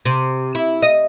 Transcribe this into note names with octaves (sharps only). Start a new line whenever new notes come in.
C3
E4
D#5